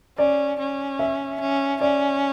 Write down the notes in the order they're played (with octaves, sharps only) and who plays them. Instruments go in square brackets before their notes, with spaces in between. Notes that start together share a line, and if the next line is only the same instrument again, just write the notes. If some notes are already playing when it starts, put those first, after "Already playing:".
[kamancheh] C#4 [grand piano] D5
[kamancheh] C#4
[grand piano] E5
[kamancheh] C#4
[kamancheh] C#4 [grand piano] D5